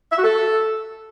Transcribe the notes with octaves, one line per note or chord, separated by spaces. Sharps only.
E5
F#4
A4